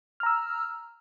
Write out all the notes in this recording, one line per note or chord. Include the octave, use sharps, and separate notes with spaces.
A#5 E6 F6